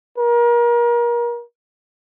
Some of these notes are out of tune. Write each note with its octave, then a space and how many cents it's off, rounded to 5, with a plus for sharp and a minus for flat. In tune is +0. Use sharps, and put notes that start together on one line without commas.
A#4 +30